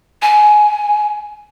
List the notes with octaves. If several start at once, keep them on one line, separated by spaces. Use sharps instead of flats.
G#5